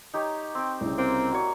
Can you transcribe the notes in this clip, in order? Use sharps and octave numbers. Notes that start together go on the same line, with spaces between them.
D#4 G4 C#5
C4 G5
C2 C#3
A#3 C4
F#4 C#5 D5 A#5